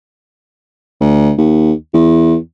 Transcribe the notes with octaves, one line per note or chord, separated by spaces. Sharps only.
D2
D#2
E2